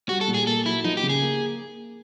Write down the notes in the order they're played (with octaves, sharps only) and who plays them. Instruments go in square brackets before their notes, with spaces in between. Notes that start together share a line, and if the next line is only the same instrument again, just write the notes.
[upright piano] G3 [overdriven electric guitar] F#4
[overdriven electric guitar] A4
[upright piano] A#2
[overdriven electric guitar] G#4
[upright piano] A#3 [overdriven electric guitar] A4
[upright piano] F#3 [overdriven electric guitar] E4
[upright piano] F3 [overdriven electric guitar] D#4
[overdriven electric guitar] G4
[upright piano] C#3
[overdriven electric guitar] G#4
[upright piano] A#3